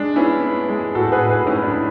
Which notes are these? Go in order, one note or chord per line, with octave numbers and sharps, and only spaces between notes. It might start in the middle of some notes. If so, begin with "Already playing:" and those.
Already playing: G#3 D4
B3 C#4 E4
B3
G#3
A2 F#4 A4
G#4 B4
A2
G#4 B4
A2 C#4 E4
D4
A2